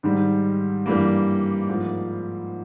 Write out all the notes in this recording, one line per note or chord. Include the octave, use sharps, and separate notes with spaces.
G#2 D#3 G3
G2 E3 G3 A#3
G#2 F3 A#3